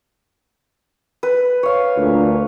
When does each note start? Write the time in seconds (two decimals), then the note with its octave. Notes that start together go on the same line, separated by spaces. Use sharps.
1.23 B4
1.63 C#5 F5
1.97 D2 A#2